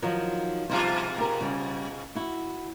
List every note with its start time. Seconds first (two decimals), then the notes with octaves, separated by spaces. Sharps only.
0.02 D#3 F3 F#3
0.69 G#2 B2 F3 G3 F4 C5
1.18 G4 A#4
1.41 C#3 G3
2.15 E4 F#4